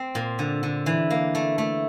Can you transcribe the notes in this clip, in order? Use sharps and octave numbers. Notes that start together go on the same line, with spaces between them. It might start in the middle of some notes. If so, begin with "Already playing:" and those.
Already playing: C4
A#2
D3
D3
E3
A#3
A3
A3